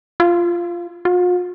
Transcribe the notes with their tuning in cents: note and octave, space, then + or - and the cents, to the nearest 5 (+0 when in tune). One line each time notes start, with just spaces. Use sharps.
F4 -10
F4 +45